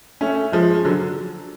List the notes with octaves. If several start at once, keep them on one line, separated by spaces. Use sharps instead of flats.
A3 C#4
F3 G#3
D3 F#3